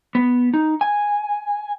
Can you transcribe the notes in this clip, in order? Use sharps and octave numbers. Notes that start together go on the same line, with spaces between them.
B3
D#4
G#5